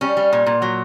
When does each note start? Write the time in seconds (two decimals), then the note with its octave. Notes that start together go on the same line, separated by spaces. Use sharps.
0.01 G3 C#4
0.17 G3
0.33 A#2
0.47 A#2
0.62 F#3